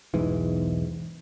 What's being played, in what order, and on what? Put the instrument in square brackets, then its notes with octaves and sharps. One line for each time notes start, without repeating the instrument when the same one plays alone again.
[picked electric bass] E1 B1 G#2 E3